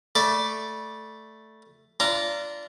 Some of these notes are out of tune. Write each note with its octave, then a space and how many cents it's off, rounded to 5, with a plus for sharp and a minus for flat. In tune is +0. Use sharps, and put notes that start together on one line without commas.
A3 +0 D5 +0 B5 -25
D4 -15 F4 -35 A#5 +0